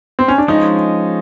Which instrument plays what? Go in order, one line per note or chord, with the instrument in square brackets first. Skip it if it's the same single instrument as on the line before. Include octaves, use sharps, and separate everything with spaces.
[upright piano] C4
C#4
D4
[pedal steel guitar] F3 G#3 C#4 [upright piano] D#4